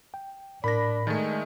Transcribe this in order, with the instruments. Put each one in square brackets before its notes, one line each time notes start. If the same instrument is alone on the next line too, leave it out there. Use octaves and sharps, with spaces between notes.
[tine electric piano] G5
[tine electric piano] A2 [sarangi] D4 [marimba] A#4 [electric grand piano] B5 A#6
[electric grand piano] D#3 A3 [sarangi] G#3 [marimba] A5 G#6 A6